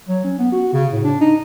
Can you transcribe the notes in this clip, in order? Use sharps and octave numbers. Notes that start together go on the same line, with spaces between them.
F#3
C#4
B3
F#4
C#3
A2
D4
D#4